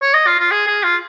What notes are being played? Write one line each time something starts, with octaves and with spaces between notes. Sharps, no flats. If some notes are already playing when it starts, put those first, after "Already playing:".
C#5
D#5
F4
F4
G#4
G#4
F4